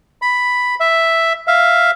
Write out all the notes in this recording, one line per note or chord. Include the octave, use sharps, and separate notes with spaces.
B5
E5
E5 F5